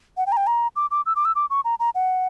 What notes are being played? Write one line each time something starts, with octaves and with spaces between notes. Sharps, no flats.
F#5
G5
A#5
G5
A#5
D6
D6
E6
D6
E6
D6
C#6
A#5
A#5
F#5